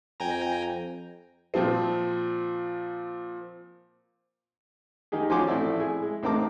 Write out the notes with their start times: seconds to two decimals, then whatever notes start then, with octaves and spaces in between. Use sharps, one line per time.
0.20 F2 G5 G#5 A#5
1.54 A#2 F3 C4
5.12 D#3 D#4 G4 G#4
5.30 F3 C#4 F#4 G#5 C6 D6
5.47 A1 A3 C4 E4 D5
5.80 E4 G#4
6.02 G#3
6.23 A1 C4 D#4 A#4 A5 D6